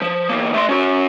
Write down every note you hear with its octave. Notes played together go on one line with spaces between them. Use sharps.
F3
E2 A#3
A3 C6
C#4 F#4